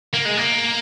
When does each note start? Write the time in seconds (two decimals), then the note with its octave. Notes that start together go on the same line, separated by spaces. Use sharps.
0.13 A#3
0.25 G#3
0.37 A#3